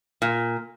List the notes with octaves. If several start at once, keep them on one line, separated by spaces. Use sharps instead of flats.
A#2